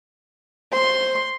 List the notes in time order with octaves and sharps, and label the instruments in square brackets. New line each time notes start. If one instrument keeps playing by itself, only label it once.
[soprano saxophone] C5 [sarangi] C6